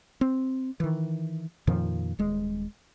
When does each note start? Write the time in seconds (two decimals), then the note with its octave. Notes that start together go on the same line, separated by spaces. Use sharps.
0.21 C4
0.80 D#3 E3
1.67 F2 A#2 D#3 F3
2.19 D#1 G#3